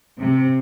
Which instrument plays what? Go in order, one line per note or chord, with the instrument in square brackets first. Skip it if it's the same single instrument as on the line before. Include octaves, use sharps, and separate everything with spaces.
[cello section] C3